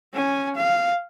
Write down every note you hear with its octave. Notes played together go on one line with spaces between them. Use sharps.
C#4 G#5
F5